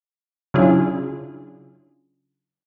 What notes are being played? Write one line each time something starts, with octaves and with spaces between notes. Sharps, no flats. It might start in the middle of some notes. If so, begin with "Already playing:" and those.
C#3 F#3 D4 E4 F4 G#4